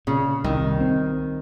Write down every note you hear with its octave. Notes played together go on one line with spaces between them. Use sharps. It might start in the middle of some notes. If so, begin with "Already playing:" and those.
A#2 C#3
C2 D#3
C4